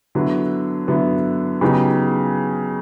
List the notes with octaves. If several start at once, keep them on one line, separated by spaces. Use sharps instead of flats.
D3 F#3 B3 E4
D3 F#3 B3 E4
C#3 F#3 B3 D#4 G4